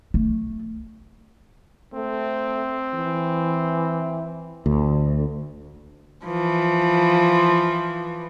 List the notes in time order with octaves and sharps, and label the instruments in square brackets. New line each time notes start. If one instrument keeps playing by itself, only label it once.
[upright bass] A3
[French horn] A3 [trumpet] C4
[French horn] E3
[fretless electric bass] D2
[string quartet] E3 F3